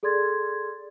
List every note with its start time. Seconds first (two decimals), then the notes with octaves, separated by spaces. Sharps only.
0.03 G#4 A4 D5 C6 G#6 A6